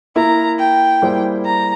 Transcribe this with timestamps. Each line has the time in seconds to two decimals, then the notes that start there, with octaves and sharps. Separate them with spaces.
0.16 A#3 E4 A#4 A#5
0.59 G5
1.02 G3 A#3 E4 G#4 C5
1.45 A#5